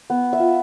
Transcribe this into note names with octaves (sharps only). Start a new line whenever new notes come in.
B3
E5
F4